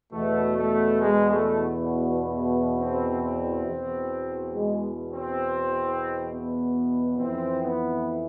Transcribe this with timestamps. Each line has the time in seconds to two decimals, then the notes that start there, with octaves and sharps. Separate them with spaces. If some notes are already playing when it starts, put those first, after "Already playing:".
0.13 E2 B2 A3
0.57 A3
1.01 G#3
1.30 A3
2.78 C4
3.22 C4
3.66 E2 B2
4.54 G#3
5.12 C4
6.30 B3
7.19 F2 E3 C4
7.63 B3